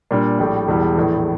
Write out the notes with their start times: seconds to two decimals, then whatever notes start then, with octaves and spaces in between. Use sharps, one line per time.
0.11 A#2 G3 D4
0.39 A#1 A2 G3
0.68 E1 E2 E3 G3
0.96 A#1 A2 E3